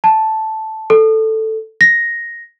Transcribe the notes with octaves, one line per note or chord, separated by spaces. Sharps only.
A5
A4
A#6